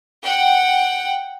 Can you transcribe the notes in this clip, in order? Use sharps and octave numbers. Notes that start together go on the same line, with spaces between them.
F#5 G5